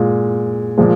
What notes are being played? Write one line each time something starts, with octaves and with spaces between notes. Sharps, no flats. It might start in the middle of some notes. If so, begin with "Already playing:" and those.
Already playing: A#2 G#3
A#2 F3 G#3